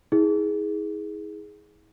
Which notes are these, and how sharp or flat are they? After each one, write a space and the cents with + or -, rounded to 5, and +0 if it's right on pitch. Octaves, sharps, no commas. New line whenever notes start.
E4 -45 G#4 +0